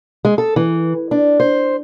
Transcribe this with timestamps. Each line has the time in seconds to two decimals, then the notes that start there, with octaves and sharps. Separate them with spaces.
0.25 G#3
0.38 A4
0.56 E3
1.11 D4
1.40 C5